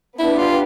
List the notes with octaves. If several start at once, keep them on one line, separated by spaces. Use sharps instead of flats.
B3 D4 E4 G4
F4